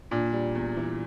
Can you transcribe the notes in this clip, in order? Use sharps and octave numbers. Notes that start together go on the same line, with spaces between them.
A#2 D4
G3
E2
E3